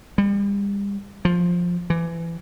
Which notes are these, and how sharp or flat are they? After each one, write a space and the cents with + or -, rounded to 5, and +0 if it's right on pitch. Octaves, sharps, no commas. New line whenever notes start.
G3 +40
F3 +10
E3 +25